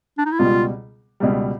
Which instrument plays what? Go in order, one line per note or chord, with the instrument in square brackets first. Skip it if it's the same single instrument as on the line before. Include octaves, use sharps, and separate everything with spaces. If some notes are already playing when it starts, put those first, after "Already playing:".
[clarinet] D4
D#4
E4
[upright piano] C#2 B2 G3 [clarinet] F4
[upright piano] C#2 B2 G3